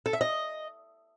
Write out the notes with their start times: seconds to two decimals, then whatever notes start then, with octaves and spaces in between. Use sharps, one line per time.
0.06 A4
0.13 E5
0.21 D#5